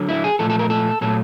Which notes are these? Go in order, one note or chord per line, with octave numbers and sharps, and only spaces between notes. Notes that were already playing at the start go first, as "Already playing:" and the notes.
Already playing: D3 F#3
E4
G#4
A#2 F3 A3 A4
A4
A#4
A4
A#2 F#3 A3 A4